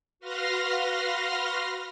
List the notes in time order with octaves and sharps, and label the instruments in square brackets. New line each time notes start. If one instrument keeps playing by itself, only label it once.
[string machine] F#4 B4 F5 C6 F6 A#6